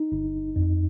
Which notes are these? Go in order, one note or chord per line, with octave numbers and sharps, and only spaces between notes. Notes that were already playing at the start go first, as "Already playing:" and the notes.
Already playing: D#4
G1
F2